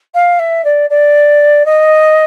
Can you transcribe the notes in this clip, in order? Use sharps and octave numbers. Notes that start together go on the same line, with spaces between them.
F5
E5
D5
D5
D#5